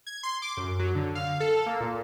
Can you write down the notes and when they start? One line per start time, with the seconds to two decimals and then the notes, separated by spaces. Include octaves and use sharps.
0.07 G#6
0.23 C6
0.42 D6
0.57 F#2
0.79 F#3
0.95 D3
1.15 F5
1.40 A4
1.66 A#3
1.80 A#2